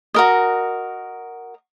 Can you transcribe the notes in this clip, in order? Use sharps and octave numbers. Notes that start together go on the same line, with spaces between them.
F#4 A#4 D#5